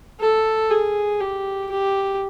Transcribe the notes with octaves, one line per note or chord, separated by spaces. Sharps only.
A4
G#4
G4
G4